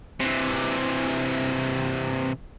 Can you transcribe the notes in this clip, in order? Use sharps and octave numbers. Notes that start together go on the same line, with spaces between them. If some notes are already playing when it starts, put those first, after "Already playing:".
C3 E3